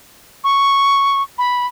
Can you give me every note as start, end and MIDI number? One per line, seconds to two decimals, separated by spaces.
0.44 1.22 85
1.38 1.67 83